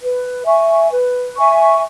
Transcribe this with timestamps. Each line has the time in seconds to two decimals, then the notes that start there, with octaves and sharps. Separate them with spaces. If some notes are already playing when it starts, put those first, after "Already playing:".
0.02 B4
0.46 E5 G#5 C#6
0.92 B4
1.36 E5 G#5 C#6